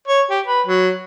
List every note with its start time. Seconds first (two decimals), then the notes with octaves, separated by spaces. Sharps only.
0.07 C#5
0.31 G4
0.46 B4
0.66 F#3